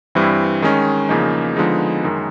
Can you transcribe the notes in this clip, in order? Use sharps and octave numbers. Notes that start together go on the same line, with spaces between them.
G2 E3 G3 C4 E4
D#3 G#3 C#4
E2 C#3 F3 A#3 D#4
D3 F3 G#3 B3 D#4
F#2 D#3 G#3